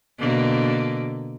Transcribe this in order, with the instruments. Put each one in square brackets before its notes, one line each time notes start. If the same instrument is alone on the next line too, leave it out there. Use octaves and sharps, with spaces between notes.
[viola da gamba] B2 D3 A#3